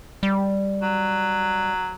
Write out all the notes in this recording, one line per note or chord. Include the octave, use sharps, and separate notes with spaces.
G3
F#3